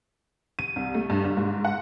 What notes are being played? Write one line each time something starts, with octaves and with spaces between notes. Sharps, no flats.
D#7
C2
A3
G2
G1
G#2
F#5